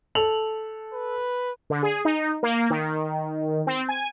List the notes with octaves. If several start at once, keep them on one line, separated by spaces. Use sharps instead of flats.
A4 F7 F#7
B4
D3
G#4
D#4
A#3
D#3
C4
G#5